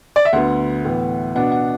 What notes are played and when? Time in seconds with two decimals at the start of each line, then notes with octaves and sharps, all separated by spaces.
0.16 D5
0.25 E5
0.33 D2 D3 B3 F#5
0.84 A2 E3 B3
1.35 B2 B3 D4 F#5
1.52 F#5